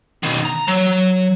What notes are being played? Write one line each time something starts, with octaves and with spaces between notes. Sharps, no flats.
B2 D#3
A#5
F#3